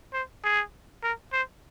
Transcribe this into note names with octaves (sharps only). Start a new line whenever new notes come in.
C5
G#4
A#4
C5